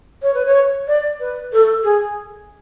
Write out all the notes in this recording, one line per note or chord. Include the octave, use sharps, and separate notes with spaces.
C#5
B4
C#5
D5
B4
A4
G#4